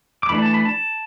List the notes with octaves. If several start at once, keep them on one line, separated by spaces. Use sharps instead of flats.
D6
E3 A3 D4 B5
A5
B5
A5